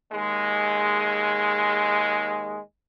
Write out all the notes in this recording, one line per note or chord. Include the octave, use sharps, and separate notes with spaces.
D#2 G#3